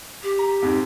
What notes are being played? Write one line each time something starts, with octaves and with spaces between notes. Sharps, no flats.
G4
A#5
F2 G#2